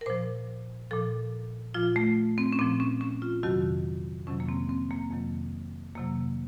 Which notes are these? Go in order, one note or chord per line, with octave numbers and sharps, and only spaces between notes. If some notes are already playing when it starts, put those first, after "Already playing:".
A#4
A#2 F3 C5
A#2 F3 A4
A#2 F3 F4
A3
C4
C#4
A#2 F3 C4
C#4
C#4
F4
F2 C3 D#3 F#3 F#4
F2 C3 D#3 F#3 C#4
A#3
C4
C4
A#3
F2 C3 D#3 F#3
F2 C3 D#3 F#3 A#3